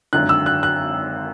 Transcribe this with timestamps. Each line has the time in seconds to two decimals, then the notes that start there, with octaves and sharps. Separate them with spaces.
0.13 G#1 F#2 D3 F#6
0.29 E6
0.46 F#6
0.63 F#6